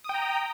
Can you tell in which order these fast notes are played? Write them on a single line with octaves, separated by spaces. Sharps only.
D#6 G5 A#5